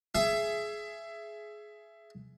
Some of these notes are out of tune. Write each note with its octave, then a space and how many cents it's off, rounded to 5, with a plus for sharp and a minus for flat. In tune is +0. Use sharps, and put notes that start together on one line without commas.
G#4 +20 E5 +20